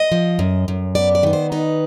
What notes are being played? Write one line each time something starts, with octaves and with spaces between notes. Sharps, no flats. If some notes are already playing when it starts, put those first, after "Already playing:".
Already playing: D#5
F3
F#2
F#2
B3 D5
D5
D#3 B4
C5
D#4 B4